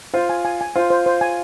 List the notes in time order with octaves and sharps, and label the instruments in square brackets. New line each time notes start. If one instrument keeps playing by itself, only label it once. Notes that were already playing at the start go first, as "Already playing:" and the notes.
[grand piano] F4 [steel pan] C5
[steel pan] G#5
G#5
G#5
[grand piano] F4 [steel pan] C5
[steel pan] C5
C5
G#5